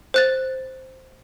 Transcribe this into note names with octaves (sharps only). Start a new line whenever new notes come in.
C5 F#6 A6